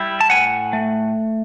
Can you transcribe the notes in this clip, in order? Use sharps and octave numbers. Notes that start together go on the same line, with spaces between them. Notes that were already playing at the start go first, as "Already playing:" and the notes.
Already playing: G3 E4
A5
A2 F#5 G#5
A3